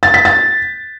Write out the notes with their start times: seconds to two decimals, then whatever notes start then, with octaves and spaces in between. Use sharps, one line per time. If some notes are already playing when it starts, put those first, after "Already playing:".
0.03 A6
0.14 B6
0.25 A6